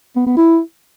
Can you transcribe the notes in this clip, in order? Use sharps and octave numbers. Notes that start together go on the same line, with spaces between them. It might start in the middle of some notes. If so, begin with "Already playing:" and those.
B3
B3
E4